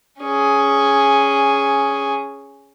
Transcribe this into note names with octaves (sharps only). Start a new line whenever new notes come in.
C#4 G#4